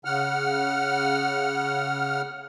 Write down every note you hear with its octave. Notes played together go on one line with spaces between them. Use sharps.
C#3 F#5 F6